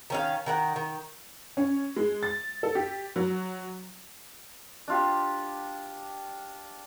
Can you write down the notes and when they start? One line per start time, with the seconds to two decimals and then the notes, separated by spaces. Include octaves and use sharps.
0.10 D#3 C#4 F5
0.46 D#3 A#4 F#5
0.76 D#3
1.57 C#4
1.96 G#3
2.23 A6
2.63 A4
2.75 G4
3.16 F#3
4.88 D4 F4 G4